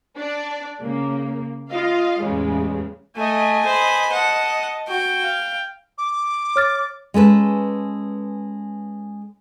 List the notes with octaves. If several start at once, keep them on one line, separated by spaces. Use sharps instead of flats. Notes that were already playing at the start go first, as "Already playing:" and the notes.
D4 D5
C#3 A#3
F4 D#5 F5
E2 A2 C#3 G3 G#3
A3 D#5 G#5
C5 B5
D#5 F#5 A5
F#4 G5
F5
D6
C#5 F6 A6
G#3 C#4 A4 B4